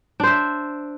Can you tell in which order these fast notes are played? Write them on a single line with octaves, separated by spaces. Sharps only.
D4 C5 E5